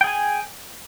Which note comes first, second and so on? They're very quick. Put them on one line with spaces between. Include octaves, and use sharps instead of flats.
G5 G#4 G#5